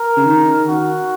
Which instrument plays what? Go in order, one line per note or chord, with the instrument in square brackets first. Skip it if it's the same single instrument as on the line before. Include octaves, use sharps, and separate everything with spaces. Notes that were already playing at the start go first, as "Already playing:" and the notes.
Already playing: [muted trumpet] A#4
[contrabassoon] C#3
D#3
[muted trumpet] F#4